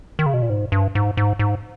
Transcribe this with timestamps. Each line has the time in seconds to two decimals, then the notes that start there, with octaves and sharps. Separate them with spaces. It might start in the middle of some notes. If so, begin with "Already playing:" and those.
0.19 D#3
0.26 C#3
0.34 B2
0.42 A#2
0.50 G#2
0.72 G2
0.95 G#2
1.17 G#2
1.39 G#2